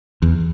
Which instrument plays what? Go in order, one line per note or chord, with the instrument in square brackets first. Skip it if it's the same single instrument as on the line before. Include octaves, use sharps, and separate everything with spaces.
[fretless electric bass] E2